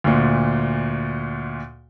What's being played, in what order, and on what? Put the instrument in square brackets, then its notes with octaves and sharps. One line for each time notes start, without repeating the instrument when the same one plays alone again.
[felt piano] D2 A#2